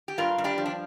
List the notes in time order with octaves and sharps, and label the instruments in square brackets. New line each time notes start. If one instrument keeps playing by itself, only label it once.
[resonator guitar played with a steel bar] G4
G2 F4 A#4
G2
D4 G4
F3
D4